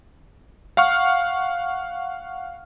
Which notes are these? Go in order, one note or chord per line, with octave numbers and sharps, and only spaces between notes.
F5 F#5 C#6 F6